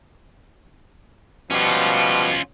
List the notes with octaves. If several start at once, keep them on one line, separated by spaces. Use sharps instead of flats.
B2 F3 G3 C#4 F4